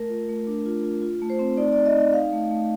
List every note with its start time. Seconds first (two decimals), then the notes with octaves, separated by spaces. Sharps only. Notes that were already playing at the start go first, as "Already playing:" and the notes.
Already playing: A3 A#4
0.09 F4
0.29 A3
0.47 D4
0.65 F4
0.83 F4
1.02 F4
1.22 A3
1.30 C5
1.39 C4
1.57 D#4 D5
1.73 D#4 D5
1.86 D#5
1.96 D#4 D#5
2.13 D#4 F5
2.33 A3
2.51 A3